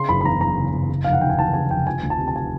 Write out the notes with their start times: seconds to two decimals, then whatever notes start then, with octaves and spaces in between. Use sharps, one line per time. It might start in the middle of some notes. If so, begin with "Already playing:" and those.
Already playing: C#3 C6
0.09 F#1 B5
0.21 B5
0.24 E2 A#5
0.41 F#1 A#5
0.57 C#3
0.73 F#1
0.89 C#3
1.04 F1 F5
1.13 F#5
1.21 D#2 G5
1.30 G#5
1.39 E3 A5
1.54 C#3 G#5
1.71 F1 G5
1.87 F3 G#5
2.03 D2
2.10 A5
2.19 C3
2.28 A5
2.36 G#5